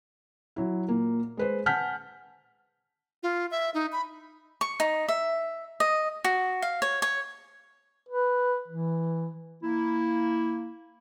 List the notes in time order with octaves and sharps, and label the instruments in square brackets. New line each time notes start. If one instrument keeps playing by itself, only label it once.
[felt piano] F#3 E4
A#2 A#3
G#3 B4 C5
F#5 G#5 A5 F6 G6 B6
[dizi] F4
E5
D#4
B5
[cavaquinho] C#6
D#4
E5
D#5
F#4
F5
C#5
C#5
[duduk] B4
E3
[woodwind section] A#3 E4